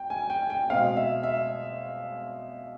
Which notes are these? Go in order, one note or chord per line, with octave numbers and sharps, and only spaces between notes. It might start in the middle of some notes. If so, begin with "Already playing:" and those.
Already playing: G5
G#5
G5
G5
B2 G#3 C4 F5
E5
E5